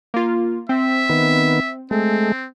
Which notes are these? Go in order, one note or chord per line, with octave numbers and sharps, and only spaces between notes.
A#3 F4
C4 E5
D#3 B3
G#3 A3 C4